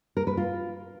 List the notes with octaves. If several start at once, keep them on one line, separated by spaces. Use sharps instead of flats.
A#4
B4
F4